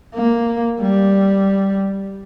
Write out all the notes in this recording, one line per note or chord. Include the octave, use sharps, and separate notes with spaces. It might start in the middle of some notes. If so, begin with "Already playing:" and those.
A#3
G3